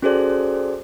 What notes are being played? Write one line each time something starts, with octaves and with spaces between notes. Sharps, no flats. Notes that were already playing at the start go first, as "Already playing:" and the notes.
C#4 F#4 G#4 A4 C5 D5